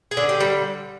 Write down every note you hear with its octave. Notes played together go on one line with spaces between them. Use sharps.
G#4
D3
G4
G3